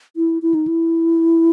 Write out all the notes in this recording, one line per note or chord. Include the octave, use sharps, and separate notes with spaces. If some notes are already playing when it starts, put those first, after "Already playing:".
E4
E4
D#4
E4